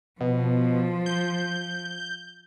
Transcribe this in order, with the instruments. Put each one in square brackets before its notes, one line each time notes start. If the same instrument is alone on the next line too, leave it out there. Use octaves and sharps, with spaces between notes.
[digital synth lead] B2 [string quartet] F3
[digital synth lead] G6